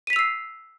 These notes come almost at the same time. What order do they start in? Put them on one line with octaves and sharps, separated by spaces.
D#7 B6 F7 E6 C7